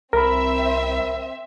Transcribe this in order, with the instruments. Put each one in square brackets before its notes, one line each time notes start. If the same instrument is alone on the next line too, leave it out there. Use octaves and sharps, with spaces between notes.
[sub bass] C2 [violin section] C4 E5 [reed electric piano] A#4 B5